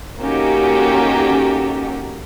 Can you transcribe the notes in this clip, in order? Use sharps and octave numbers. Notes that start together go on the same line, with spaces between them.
A#3 C#4 D#4 F#4 G4 A4